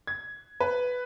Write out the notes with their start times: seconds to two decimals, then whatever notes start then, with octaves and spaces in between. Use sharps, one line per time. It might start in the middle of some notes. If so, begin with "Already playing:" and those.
0.07 G#6
0.60 B4